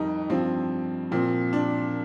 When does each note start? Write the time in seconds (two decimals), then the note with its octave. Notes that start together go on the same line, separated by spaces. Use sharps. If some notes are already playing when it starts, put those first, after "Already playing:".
Already playing: F2 D#3 G3 D#4
0.30 G2 F3 C4
1.11 A#2 F3 C4
1.53 D4